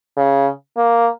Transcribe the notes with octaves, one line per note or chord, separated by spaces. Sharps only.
C#3
A#3